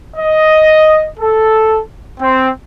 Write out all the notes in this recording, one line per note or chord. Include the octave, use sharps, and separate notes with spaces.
D#5
A4
C4